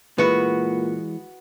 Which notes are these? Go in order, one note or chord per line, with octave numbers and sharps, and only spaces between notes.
A#2 E3 G#3 B3 F#4 B4